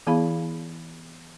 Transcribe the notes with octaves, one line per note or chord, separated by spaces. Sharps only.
E3 B3 E4 G#4 F5 B5